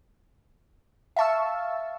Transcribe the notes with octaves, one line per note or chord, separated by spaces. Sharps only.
E5 F5 A5 C#6 E6